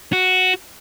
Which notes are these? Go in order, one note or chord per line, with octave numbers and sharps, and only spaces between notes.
F#4